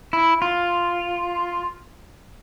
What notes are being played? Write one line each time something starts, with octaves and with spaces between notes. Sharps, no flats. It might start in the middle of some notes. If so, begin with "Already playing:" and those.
E4
F4